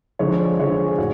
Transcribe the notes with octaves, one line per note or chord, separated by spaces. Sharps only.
D3 F3 G#3 C#5
D5
D3 F3 G#3 C#5
G#4
A2 F#4